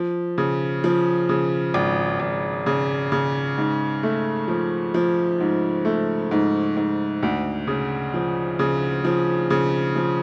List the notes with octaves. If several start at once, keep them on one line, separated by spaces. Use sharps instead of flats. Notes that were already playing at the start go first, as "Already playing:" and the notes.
Already playing: F3
C#3
F3
C#3
G#1
G#1
C#3
C#3
G#2
A3
F3
F3
G#2
A3
G#2
G#2
D2
C#3
F3
C#3
F3
C#3
F3